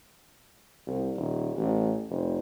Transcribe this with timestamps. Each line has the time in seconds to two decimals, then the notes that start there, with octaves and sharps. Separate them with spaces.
0.87 C2
1.15 D#1
1.57 A1
2.10 F1